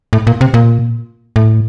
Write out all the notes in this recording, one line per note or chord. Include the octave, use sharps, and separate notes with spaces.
A2
A#2
C3
A#2
A2